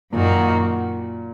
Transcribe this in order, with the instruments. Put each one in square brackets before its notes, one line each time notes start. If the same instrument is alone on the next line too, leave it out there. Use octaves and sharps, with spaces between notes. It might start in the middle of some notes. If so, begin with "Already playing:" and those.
[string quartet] F#2 D#3 A#3 F#4 [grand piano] A#2